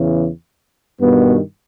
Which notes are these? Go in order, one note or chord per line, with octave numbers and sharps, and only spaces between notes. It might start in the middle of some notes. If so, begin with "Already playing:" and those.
Already playing: E2 C#3 E3
G2 B2 D#3 B3